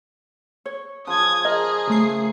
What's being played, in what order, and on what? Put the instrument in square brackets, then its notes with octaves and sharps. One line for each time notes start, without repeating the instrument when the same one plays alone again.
[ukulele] C#5
[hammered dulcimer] C#3 F3 [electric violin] D#6 G#6
[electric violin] G#4 [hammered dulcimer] A#4 [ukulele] D#5
[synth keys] C#3 A3 C7